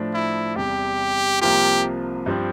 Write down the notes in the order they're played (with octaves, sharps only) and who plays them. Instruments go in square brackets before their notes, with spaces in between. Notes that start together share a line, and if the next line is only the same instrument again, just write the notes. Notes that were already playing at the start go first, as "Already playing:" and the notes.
Already playing: [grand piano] A2 F3 A3 D4
[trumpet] E4
[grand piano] E2 C3 G3 [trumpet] G4
[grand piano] C2 C3 F3 A#3 F4 [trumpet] G4
[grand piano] G2 F3 C4